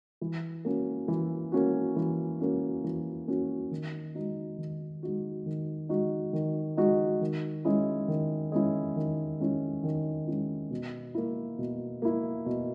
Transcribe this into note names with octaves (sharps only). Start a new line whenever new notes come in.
E3
A#3 C#4 F#4
E3
A#3 C#4 F#4
E3
A#3 C#4 F#4
E3
A#3 C#4 F#4
D#3
G#3 D#4 F#4
D#3
G#3 D#4 F#4
D#3
G#3 D#4 F#4
D#3
G#3 D#4 F#4
D#3
G#3 C#4 E4
D#3
G#3 C#4 E4
D#3
G#3 C#4 E4
D#3
G#3 C#4 E4
B2
A#3 E4
B2
A#3 E4
B2